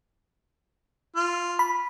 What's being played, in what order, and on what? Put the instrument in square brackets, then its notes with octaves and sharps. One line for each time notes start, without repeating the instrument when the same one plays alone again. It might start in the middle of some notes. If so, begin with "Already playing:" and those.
[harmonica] F4
[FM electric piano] B5